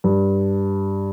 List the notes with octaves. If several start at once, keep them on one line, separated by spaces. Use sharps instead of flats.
G2